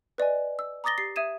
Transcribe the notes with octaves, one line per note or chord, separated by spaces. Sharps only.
B4 D5 D#5 G#5
E6
A#5 D6 D#6 A6 A#6 G7
G4 A6 C7
E5 D#6 G#6 D#7 E7